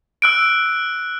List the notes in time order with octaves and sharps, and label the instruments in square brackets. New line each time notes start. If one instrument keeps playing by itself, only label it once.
[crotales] E6 F#6 D7